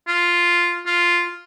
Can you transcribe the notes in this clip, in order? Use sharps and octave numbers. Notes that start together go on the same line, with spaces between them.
F4
F4